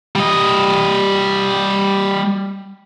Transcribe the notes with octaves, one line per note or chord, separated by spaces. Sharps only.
G3 D#5